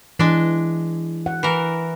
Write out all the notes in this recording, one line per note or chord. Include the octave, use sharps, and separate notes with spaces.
E3 G#3 D4
F#5
E3 A#4